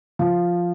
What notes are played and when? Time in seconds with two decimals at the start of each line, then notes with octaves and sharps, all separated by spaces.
0.19 F3